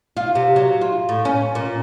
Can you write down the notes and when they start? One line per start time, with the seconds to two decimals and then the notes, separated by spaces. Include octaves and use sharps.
0.17 F4
0.35 C3
0.56 F#3
0.81 F4
1.09 A2
1.25 C#4
1.55 A#2